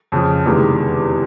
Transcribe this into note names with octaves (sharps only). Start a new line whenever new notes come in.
F2 C#3 F3
E2 C3 D#3 G#3